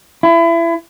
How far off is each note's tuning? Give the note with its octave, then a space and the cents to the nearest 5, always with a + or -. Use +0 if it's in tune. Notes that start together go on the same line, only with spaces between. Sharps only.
E4 +30